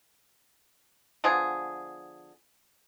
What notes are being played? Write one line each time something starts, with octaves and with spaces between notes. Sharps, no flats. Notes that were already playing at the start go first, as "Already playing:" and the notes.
D3 F3 B3 G#4